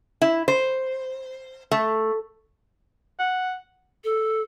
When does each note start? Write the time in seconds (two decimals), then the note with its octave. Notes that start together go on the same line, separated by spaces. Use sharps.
0.21 E4
0.48 C5
1.71 A3
3.20 F#5
4.04 A4